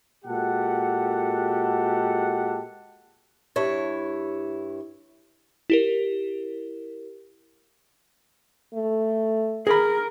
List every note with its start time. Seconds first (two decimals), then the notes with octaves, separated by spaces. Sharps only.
0.24 A#2 G#3 F#4 G4 A4 F#5
3.56 G2 E4 C#5
5.70 E4 G4 A#4
8.74 A3
9.67 G#4 A#4 B5